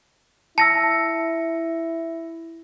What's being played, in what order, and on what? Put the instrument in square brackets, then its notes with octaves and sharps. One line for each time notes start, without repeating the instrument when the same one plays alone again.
[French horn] E4 [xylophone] A5 [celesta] E6 A#6 C#7